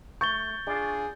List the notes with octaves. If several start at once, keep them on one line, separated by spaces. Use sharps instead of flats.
A3 C#6 G6 A6 G7
D4 F4 G#4